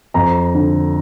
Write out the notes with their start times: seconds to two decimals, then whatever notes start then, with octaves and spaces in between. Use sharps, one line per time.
0.14 F2 A#5
0.54 D3